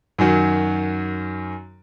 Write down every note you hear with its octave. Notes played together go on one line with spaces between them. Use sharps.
F#2 D#3 F#3